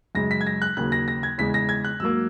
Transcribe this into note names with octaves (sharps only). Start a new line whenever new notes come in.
F#2 C#3 G#3 A#6
B6
G#6
A#6
F#6
D#2 C#3 F#3 A#3 F#6
A#6
A#6
G#6
E2 C#3 G#3 B6
A#6
G#6
F#6
G#2 F#3 A#3 E6